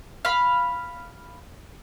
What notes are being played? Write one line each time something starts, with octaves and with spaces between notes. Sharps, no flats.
F5 B5